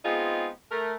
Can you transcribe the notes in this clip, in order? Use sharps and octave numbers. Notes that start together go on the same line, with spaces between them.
G#3 B3 C4 D#4 F4 G#4
A3 A#4